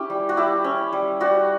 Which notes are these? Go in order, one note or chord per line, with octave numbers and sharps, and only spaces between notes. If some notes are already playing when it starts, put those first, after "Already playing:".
Already playing: C#4 E4 G4
G3
F#4
E4 G4
C#4
G3
G3 F#4